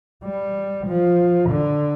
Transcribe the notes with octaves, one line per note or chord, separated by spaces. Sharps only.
G3
F3
D3